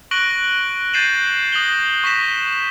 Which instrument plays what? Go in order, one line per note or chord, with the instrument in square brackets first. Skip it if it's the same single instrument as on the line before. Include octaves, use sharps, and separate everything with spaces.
[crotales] C#6 F#6 A#6 D7 F#7 G7
G6 A6 C7 D#7 E7 F#7
D#6 A#6 F#7 G7
C#6 A#6 B6 E7